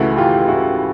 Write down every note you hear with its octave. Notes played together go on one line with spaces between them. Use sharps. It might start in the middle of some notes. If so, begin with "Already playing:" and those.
Already playing: C#2 C#3 E3 A3 E4 F#4
F4 G4
E4 F#4